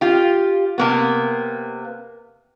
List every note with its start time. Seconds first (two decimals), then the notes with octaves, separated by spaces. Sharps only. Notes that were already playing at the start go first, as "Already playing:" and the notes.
0.01 F4 G4
0.78 C3 A#3 B3